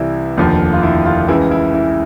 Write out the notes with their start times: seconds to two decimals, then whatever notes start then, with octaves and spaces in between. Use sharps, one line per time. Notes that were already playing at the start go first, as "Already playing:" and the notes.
Already playing: C2 C3 E3 E4
0.37 F1 D#2 D3 F3
0.73 F4
0.83 E4
1.06 F4
1.28 C#2 C#3 E3 E4
1.51 E4
1.74 E4